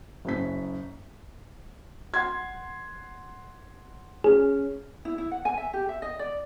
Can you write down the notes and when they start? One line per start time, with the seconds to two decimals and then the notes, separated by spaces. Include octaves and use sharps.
0.25 F#1 F#2 B6
2.14 F#5 C6 G#6
4.24 C#4 G#4
5.05 E4
5.18 E4
5.31 F#5
5.45 G#5
5.58 E5
5.73 G4
5.89 E5
6.02 D#5
6.19 D5